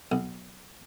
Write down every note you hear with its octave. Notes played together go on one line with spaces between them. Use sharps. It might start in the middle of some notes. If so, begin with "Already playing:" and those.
B1